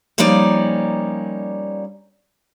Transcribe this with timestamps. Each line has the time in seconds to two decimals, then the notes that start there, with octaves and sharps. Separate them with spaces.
0.18 F3 G3 A#3 C#4 D#4 D5